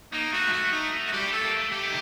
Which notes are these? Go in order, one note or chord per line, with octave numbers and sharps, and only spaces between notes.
A#3 D#4
A3 F#4
G3
A3 F#4
D#4
F#4
G3 G4
A3 A4
A#3
A3
A3 G4
D#3